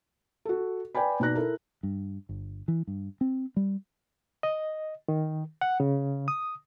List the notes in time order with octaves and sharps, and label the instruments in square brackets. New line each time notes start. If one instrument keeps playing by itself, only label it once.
[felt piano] F#4 A4
B4 D5 G5 G#5 B5
B2 D#4 D5 F#6 A#6
E4 A4 A#4
[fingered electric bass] G2
G1
E3
G2
C4
G3
[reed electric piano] D#5
D#3
F#5
C#3
D#6